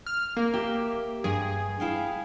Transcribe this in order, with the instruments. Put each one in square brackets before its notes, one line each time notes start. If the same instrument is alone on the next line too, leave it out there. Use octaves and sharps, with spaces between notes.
[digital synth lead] F6
A#3
[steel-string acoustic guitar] G4 E5
[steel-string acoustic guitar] G2 [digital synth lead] G#4
[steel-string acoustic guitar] E4 F5 G5